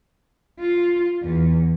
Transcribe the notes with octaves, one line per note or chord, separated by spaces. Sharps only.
F4
E2